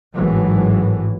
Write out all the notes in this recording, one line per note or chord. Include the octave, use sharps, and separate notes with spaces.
G#1 A2 E3 F#3